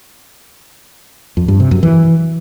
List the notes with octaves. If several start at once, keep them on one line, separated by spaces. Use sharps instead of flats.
F2
G2
C3
F#2
E3